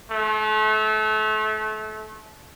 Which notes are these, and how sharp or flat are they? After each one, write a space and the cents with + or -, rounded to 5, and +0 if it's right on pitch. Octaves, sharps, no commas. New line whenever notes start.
A3 -30